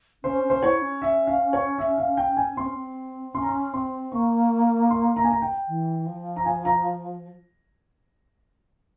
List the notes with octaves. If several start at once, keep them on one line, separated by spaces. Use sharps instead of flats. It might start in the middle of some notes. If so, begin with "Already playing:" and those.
C#4 C5
C#4
C5
E4 C#5
C#4
E5
F5
C#5
E5
F5
G5
G#5
C4 C6
C#4
C4
C#4 C6
A#5
C6
C4 C6
A#3 C#6
C6
A#5
G#5
A#5
G5
E3
F3
A#5
G#5
A#5